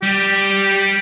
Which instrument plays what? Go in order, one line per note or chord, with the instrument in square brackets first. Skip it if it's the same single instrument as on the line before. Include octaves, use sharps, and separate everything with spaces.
[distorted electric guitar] G3 [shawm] G4